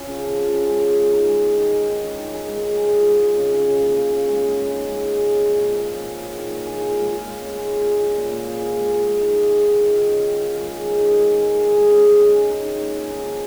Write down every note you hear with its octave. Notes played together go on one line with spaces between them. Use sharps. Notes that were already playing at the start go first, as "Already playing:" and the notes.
Already playing: C#4 F4
C#3
F3
F4
C#4
G#3
G#4
G#3
D#4
G#3
G#4
D#3
G#4
D#3
C#4
D#3
G#4
G#3
G#4
G#3
F4
G#3
G#4
C#3
C#4
C#3
A#3
C#3
C#4
G#3
G#4
G#3
D#4
G#3
G#4
G#4
C#4
A#2
F3
G#4
C#4
G#4
F4
D#3
A#3
G#4
F4
G#3
F4
G#3
C#4
G#3
F4
G#4
F4
A#2
A#3
G#4
F4
G#3
G#4
G#3
D#4
G#3
G#4
D#3
F4
D#3
C#4
D#3
F4
G#3
G#4
G#3
D#4
G#3
G#4
G#3
G#4
G#3
C#4
G#3
G#4
G#4
D#4
D#3
A#3
G#4
D#4
F3